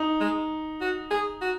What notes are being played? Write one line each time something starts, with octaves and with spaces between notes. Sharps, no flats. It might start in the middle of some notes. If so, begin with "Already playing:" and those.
Already playing: D#4
G#3
F#4
G#4
F#4